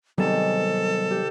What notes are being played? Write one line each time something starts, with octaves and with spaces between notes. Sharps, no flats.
C3 D#3 F#3 G3 B3 G#4 A4
G4